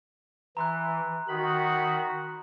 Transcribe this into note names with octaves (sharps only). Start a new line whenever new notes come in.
E3 A#5 C6 F#6
D#3 F#4 B5